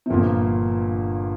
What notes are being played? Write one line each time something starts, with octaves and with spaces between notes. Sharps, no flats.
C3
G1 G2 A#2 F3 A#3